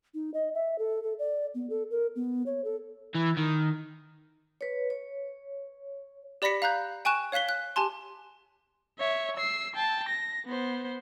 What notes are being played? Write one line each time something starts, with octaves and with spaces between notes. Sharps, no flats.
D#4
D#5
E5
A4
A4
D5
B3
A4
A#4
B3
C#5
A4
E3
D#3
B4 C#5
C#5
G4 D5 B5 A#6 B6 C#7
F5 A#5 F#6 G6
G5 G#5 C#6 F#6 E7
C#5 F5 F#6 B6 G7
F#6
G4 G#5 A5 C6
C#5 E5
E6 C7
G5 A5
A#6
B3 C5